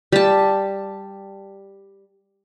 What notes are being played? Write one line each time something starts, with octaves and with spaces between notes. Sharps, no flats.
G3 A5